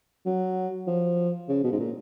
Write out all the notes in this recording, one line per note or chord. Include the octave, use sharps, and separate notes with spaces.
F#3
F3
C#3
B2
G#2
A#2